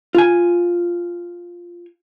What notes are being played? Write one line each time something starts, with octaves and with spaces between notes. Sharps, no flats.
F4 G#5